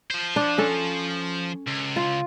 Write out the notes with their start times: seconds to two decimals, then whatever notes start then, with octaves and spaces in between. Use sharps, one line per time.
0.11 F3 C5
0.36 D4
0.58 C#4 A4
1.67 C#2
1.96 F4